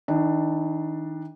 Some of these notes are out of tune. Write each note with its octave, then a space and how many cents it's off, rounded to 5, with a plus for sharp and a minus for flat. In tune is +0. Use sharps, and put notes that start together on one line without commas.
D#3 +35 D4 +10